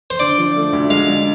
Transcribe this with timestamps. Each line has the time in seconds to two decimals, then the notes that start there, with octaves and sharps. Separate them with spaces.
0.10 C5
0.20 D3 D5
0.38 F3
0.56 A3
0.73 D2
0.89 G#3 F5
1.08 D4